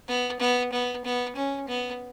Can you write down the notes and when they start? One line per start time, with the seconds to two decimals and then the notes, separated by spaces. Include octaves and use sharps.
0.08 B3
0.40 B3
0.72 B3
1.05 B3
1.36 C#4
1.68 B3